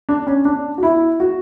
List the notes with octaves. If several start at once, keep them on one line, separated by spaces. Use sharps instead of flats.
D4
C#4
D4
F#4
E4
F#4